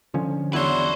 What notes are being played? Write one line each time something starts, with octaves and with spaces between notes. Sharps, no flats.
D3 F3 C#4
E2 F#3 D4 E4 F#4 B4 C5